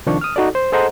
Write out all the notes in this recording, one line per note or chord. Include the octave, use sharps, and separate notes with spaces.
C2 D#3 F3 D4 C#6
D#6 F6
D#4 F#4 A4 D5
C5
G#4 A4 C5 D#5 F#5 A#5